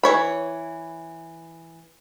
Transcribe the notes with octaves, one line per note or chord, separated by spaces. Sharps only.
E3 C#5 B5